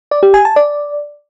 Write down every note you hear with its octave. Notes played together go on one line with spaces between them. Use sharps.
D5
G4
G#5
A5
D5